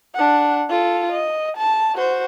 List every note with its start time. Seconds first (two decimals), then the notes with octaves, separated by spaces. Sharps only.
0.15 D4 F#5
0.70 F4 A4
1.12 D#5
1.57 A5
1.95 F#4 C5